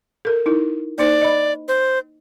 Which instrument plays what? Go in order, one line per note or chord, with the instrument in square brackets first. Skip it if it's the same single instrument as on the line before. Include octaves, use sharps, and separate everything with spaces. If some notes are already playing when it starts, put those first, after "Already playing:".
[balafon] A4 A#4
D#4 E4 A#4
[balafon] A#3 D#4 C5 [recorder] D5
[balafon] D#5 B5
[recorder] C5